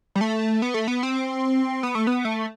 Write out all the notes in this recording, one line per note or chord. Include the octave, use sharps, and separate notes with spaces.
G3
A3
B3
A3
B3
C4
B3
A3
B3
A3